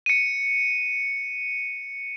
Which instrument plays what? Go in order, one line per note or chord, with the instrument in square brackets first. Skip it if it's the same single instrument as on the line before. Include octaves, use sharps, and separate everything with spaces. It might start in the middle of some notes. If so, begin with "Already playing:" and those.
[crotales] C#7 D#7